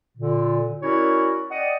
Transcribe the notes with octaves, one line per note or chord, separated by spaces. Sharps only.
A#2 D3
C#4 E4 F#4 A#4 C#5 D5
D5 D#5 F#5 G5 D#6